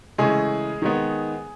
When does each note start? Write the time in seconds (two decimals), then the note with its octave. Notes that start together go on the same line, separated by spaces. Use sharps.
0.18 C#3 E3 G#3 A3 G#4
0.82 D#3 G#3 B3